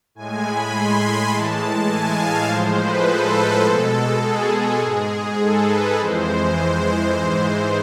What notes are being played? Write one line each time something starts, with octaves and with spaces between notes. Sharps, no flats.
A2 G#3 G#5
B5
C6
B5
A2 E3 G#3 A5
G#5
F5
A2 F3 G#3 C5
B4
A4
B2 G#3
G#4
A4
G#2 G#3 G#4
A4
B4
F2 E3 G#3 C5
G#2 E3 G#3